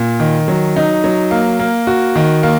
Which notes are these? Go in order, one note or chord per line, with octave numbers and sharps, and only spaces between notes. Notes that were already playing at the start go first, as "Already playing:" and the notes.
Already playing: A#2
D#3
F#3
D#4
F#3
A#3
A#3
F#4
D#3
A#3